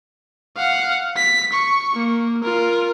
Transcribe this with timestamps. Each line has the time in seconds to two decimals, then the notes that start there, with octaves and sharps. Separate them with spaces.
0.57 F5 F#5
1.16 B6
1.53 C#6
1.94 A#3
2.43 F4 A#4